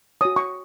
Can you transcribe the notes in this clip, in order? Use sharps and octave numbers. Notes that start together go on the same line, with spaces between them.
F#4 C#5 D#6
C#6